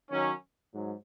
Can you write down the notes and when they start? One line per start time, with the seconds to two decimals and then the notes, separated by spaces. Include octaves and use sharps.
0.10 D#3 F#3 C#4
0.72 G#2 F#3